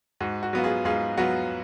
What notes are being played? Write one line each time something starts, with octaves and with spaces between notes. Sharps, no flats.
G#2 F#4
F#4
F#3 B3 F4 F#4
F4 G#4
G#2 F4 G#4
F#3 B3 F4 F#4